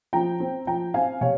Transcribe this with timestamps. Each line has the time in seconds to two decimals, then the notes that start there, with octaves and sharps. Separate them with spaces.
0.13 F3 G5 A#5
0.40 C4
0.67 F3 G5 A#5
0.94 C4 F5 G#5
1.21 C3 C#5 F5